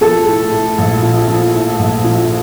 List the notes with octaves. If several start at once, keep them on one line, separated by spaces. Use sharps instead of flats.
F3 A4
A2
A2
A#1
F3
F3
A2
A#1
F3